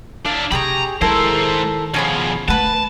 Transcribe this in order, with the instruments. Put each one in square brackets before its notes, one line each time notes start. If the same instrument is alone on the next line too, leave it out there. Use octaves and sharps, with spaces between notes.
[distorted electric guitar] D4 E4 [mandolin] F5
[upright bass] C3 [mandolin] G4 G#4 C#6 [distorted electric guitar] A#5 B5
[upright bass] D#3 [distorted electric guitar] G#3 C5 [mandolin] E4 A4 A#4
[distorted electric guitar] B2 F3 [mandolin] C#4 G#4 B5
[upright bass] A3 [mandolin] B4 F#5 [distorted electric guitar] A5